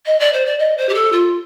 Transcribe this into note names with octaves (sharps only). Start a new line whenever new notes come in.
D#5
D5
C5
D5
D#5
C5
G4
A4
F4